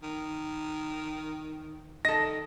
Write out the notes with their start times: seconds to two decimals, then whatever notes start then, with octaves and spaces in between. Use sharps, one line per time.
0.03 D#3
2.05 D#3 A4 D#5 A#6